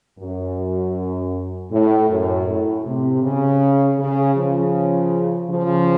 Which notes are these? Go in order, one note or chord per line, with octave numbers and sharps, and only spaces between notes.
F#2
A2
F#2
A2
C3
C#3
C#3
C#3 F3
C#3 F3